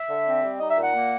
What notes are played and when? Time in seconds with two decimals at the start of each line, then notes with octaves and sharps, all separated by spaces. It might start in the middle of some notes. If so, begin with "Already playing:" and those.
Already playing: E5
0.08 D3
0.26 C4
0.42 G3
0.59 D#4 D#5
0.70 E5
0.76 A#2
0.82 F#5
0.93 A#3